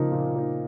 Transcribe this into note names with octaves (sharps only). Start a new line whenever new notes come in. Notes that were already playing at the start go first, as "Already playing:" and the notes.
Already playing: C#3 F3 A#3 D#4
A#2
F3 A#3 D#4